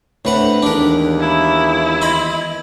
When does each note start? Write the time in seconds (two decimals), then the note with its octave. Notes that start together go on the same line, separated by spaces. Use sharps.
0.25 A2 A3 C4 D4 B4 F#5
0.62 D#2 E3 G#3 B3 D4 A#4
1.20 E4
2.02 D#5 B5 C6